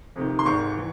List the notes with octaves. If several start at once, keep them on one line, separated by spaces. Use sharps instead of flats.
F2 C3 D#3
C6
G#1 G#2 D#3 C#6
E3